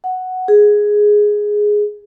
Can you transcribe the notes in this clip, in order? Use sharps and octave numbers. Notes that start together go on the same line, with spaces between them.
F#5
G#4